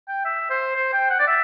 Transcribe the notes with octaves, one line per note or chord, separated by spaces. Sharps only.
G5
E5
C5
C5
G5
F#5
D5
E5